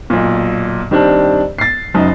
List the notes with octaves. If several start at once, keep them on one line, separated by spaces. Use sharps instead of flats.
B1 A#2
D#3 G3 C4 D4
A6 C7
F#1 F#2 D#4